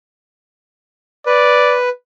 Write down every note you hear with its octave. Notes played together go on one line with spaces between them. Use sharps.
B4 D5